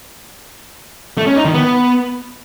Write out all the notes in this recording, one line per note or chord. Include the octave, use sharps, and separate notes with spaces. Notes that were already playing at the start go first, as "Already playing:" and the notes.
A3
C#4
D#4
D#3
B3